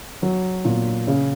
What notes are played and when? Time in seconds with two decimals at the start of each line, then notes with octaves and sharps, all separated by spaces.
0.22 F#3
0.65 A#2
1.07 C#3